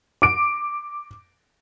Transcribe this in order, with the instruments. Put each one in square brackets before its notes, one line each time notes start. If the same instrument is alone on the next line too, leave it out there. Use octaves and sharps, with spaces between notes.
[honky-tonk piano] D6 D7